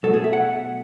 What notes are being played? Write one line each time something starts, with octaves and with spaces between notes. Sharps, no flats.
B2 F#3 A3 A4
G#4
E5
F#5